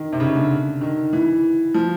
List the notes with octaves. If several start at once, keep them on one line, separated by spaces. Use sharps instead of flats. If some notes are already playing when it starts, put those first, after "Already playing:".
Already playing: D#3
C3
C#3
D3
D#3
E3
F3